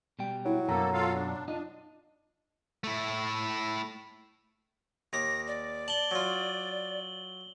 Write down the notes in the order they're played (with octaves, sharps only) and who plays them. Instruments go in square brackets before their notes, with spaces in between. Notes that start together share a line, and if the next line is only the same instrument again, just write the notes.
[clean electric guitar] B2 G3 G5
[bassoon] F#3 [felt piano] E4
[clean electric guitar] F#2 B2 [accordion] A#3 A4 [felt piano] A#5
[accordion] F4 A4 F5
D4
[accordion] D4 [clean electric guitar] D#4 F4 D#5
[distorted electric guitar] A3 E4
[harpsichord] D#2 D6 [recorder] A#6
[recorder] D5
[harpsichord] A5 [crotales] F#7 G7
[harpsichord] F#3 F4